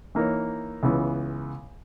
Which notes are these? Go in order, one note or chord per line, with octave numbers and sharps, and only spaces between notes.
E3 A#3 D#4 A#4 C#5
C#2 C#3 E3 B3